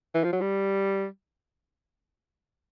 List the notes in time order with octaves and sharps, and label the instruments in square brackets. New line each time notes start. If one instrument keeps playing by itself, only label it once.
[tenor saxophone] E3
F3
F#3
G3